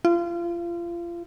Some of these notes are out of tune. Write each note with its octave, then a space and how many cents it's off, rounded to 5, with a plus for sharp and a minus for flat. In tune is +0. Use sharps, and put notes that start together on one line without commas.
F4 -30